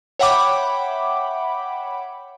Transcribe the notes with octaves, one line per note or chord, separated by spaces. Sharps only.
C#5 E5 F#5 G5 B5 D6